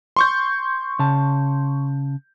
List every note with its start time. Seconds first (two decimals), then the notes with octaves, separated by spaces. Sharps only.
0.17 C6 C#6 G6
0.99 C#3 A5